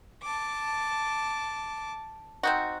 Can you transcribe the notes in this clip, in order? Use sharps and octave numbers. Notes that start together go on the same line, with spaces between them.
A5 D6
C4 D#4 F#4